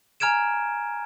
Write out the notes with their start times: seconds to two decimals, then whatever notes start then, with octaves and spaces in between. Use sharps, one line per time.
0.20 G#5 A#5 F6 G#6 D7 E7